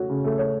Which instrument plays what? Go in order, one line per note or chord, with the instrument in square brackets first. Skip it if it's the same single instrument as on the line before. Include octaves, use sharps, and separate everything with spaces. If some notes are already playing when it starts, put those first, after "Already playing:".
Already playing: [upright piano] A3 F#4 C#5
C#3
A3
C#5